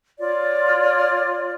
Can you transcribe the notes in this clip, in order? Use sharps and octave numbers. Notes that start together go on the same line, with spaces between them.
F4 C#5 D5